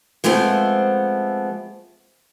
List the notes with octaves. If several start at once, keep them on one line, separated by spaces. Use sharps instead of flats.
F3 G#3 A3 B3 C4